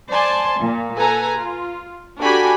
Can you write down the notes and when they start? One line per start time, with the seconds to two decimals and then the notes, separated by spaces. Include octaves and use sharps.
0.11 C5 D5 G#5 A5 C6
0.59 A#2
0.98 A4 B4 G#5 A#5
1.38 F4
2.18 D4 F#4 G4 A4 G#5 B5